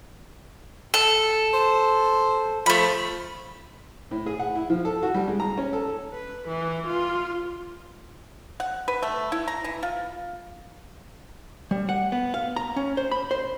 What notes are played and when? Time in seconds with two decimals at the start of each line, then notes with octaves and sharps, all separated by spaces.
0.94 A4
1.54 C5
2.66 F3 A3 B5
4.11 A2
4.26 G#4
4.39 F#5
4.55 E4
4.70 F3
4.85 A4
5.03 F#4
5.15 G3
5.28 G#3
5.40 A#5
5.58 C#4
5.73 A4
6.12 B4
6.47 E3
6.86 F4
8.60 F#5
8.88 B4
9.02 A3
9.32 E4
9.48 A#5
9.64 E3
9.83 F4
11.71 G3
11.89 F#5
12.12 B3
12.34 F5
12.56 A#5
12.76 C#4
12.97 C5
13.11 B5
13.31 C5